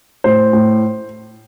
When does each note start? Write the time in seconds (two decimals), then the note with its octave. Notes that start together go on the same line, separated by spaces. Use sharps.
0.24 A2 C5
0.53 A2